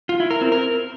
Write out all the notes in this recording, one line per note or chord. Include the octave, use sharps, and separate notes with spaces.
F4
E4
A#4
C4
A#4